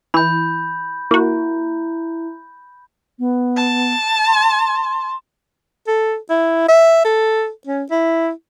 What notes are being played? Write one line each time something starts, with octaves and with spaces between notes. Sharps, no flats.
E3 B5 G6
A#3 E4 F#4
B3
A5
C6
A4
E4
E5
A4
C#4
E4